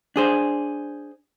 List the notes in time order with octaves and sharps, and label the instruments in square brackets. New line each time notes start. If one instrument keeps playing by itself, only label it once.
[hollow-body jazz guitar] D4 G#4 C5